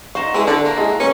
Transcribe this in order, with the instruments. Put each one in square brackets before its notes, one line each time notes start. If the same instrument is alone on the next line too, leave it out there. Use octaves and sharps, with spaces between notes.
[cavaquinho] D#4 F#4 C5 [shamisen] F5 [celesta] C#6 E7 F7
[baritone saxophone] G#3 [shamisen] C4 E4 B4 [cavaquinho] E5
[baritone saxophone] D3 [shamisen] D4 A4 [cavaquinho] E5 A5
[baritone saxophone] A#3 [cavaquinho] A#4 C5 F#5
[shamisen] G#3 E4 G#4
[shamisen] A#3 [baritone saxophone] C#4 [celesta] B4 C#6